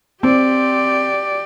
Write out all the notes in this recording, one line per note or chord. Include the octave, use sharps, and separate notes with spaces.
C4 G4 D5